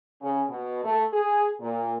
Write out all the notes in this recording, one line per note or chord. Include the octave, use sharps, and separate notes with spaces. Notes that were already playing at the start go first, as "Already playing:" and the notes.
C#3
B2
A3
G#4
A#2